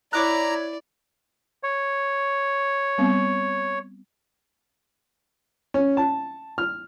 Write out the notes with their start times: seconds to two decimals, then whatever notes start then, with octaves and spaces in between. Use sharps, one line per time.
0.13 E4 C#5 D5 A#5 D6 F#6
1.63 C#5
2.98 G3 B3 C4
5.74 C#4
5.97 A5
6.58 F6